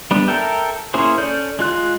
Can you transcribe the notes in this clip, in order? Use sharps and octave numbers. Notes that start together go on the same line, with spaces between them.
G3 B3 D4
A4 A#4 E5 G5
A#3 C#4 E4 G#4 C5
C#4 A4 D5 G6
G#3 F4 F#6